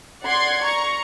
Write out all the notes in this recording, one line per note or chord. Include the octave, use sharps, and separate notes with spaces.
D5 F#5 C6 G#6
A#5 C#6